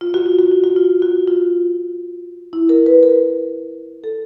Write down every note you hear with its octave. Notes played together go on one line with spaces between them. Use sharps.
F4
F#4
F4
F#4
F4
F#4
F4
F#4
F4
E4
A#4
B4
A#4
A4